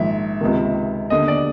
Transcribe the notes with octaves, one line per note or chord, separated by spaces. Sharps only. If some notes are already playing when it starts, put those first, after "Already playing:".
Already playing: A#1 G#2 D#3 E5
C#2 C3 D#3
D#2 D3 D#5
D5